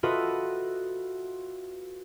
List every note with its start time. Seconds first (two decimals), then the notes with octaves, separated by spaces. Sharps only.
0.03 F4 F#4 A4 B4 D#5 E5